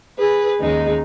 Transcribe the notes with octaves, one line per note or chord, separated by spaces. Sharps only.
G#4 B4
D#2 C#3 G#3 D#4